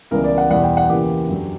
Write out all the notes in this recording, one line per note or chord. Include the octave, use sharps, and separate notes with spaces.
C#2 C#3 E3 G3 B3 A#4
D5
F#5
E2 B2 G3 F#5
G5
F#5
E2 C#3 E3 A#3 G4
F#2 D3 F#3